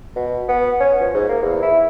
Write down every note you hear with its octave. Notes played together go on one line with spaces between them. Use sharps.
B2
B3
C#4
F3
G#2
A#3
E2
E4